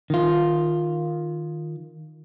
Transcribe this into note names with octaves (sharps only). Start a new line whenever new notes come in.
D#3 F4